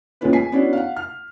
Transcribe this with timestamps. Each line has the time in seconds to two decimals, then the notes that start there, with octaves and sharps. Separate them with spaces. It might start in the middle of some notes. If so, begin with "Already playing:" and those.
0.21 D#2 G#3 B3 C#4 F4 B4
0.33 G#5 B6 C7
0.52 B3 C#4 D4 E4 F#4
0.73 F5 F#5
0.97 F6